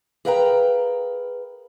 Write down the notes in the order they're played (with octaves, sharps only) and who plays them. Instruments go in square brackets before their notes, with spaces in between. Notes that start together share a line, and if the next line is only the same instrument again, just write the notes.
[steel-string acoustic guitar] G#4 A#4 B4 F5 G5 A#5